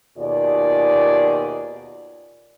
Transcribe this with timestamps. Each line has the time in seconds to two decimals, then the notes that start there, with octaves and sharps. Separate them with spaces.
0.18 D#2 B2 F4 G#4 D5